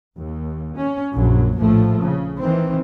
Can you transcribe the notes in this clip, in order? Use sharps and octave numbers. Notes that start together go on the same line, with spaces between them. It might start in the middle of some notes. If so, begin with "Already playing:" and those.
D#2
C#4
A#1 F#2 F#3
A#1 A2 F3 A3
C#3
D#3 E3 C4